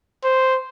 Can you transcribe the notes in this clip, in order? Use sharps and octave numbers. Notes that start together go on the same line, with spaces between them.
C5